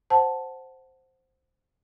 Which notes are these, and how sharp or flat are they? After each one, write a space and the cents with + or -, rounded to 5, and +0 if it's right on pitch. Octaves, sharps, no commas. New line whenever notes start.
C5 +0 F#5 +0 A5 +0